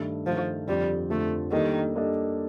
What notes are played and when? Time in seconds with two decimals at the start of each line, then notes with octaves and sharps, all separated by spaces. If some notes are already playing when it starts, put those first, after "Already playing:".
Already playing: G2 D#3 A3
0.26 G2 D#3 F3 A3
0.68 F2 D3 F3 G3
1.10 F2 D3 F3 A3
1.52 D#3 G3 A#3 D4 A4 D#5
1.94 G3 A#3 D4 A4 D#5